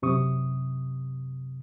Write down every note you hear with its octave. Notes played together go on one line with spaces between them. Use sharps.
F#2 C3 C#6 D#6